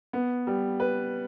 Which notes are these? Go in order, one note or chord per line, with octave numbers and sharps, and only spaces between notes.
B3
G3
B4